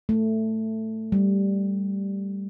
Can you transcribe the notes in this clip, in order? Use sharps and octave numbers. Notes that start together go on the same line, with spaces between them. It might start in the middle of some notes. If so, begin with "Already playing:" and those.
A3
G3